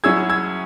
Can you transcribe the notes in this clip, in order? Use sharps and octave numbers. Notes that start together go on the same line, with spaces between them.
F#3 C#4 E4 G#4 E6 G#6
E6 G#6